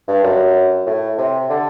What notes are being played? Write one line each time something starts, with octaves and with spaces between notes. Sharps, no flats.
G2
F#2
A2
C3
D3